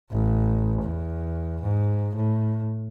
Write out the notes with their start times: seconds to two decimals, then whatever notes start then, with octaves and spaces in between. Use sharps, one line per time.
0.11 A1
0.81 E2
1.62 G#2
2.15 A2